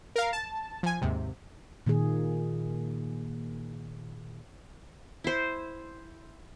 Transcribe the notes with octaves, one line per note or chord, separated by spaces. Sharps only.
A#4 F5
A5
F3 G#5
D#2 G#2 C3
A#2 D#3 A#3 G#4
E4 C5